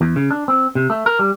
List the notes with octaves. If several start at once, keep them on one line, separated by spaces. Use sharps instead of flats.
E2
C#3
D4
C4
C3
A3
A#4
G3